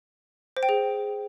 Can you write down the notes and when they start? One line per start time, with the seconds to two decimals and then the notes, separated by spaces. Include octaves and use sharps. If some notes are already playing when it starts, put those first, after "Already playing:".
0.57 C5
0.63 G5
0.69 G#4